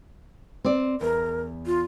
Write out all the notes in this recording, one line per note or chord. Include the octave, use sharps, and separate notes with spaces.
C4 D5
E2 A#4
F4